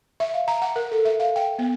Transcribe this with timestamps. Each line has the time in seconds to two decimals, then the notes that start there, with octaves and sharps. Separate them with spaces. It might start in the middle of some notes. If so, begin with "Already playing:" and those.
0.20 E5
0.34 F5
0.48 A#5
0.62 F#5
0.76 A#4
0.92 A4
1.05 E5
1.20 F5
1.36 G5
1.59 B3